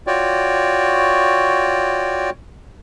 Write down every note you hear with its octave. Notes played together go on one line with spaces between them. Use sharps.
F4 F#4 C#5 D5 G5